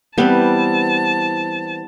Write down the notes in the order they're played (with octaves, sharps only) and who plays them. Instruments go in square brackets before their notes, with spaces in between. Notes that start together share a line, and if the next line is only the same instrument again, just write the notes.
[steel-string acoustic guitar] E3 C4 [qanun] G3 B3 D6 [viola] A5